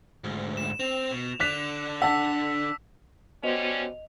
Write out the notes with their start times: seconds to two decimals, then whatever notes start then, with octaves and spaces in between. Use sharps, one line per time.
0.24 D2 G#2
0.57 E7
0.80 C4 F7
1.11 B2
1.40 D3 D4 D6 F#6 B6 F7
2.02 F#5 A5 E6 B6
3.43 D3 G3 B3 C#4 F#4 C5 D#5 F7